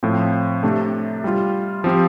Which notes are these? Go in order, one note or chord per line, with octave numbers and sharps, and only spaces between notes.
A2 F3 C4
C3 A3 D4
G3 F4
F3 C4 G4